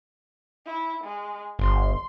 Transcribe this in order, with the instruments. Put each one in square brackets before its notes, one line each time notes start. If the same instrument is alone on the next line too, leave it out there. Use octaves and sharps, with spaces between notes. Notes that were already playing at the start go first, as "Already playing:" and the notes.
[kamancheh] E4
G#3
[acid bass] G1 [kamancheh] C6